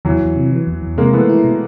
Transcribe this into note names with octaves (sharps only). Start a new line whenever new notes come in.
E2 E3 F#3
E2
C3
E3
E2
E2
C3 G#3 A#3
E3 A3 B3
E4
B2